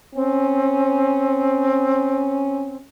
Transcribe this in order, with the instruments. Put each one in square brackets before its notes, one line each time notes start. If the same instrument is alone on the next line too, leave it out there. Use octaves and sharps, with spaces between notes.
[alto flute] C4 [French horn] C#4